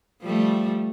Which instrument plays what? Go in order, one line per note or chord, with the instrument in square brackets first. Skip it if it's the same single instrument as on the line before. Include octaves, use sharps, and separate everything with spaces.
[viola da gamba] F3 G3 A3